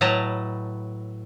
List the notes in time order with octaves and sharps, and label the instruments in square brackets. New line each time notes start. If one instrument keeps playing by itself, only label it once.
[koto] A2 F#3 B4 D#5 A5 A#5